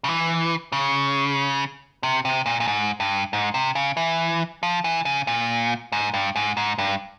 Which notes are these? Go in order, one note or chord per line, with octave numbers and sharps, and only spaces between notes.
C#3
E3
C#3
C3
C3
A#2
A#2
G#2
G2
G#2
C3
C#3
E3
F3
E3
C#3
A#2
G#2
G2
G#2
G#2
G2